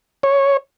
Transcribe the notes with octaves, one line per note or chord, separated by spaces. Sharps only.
C#5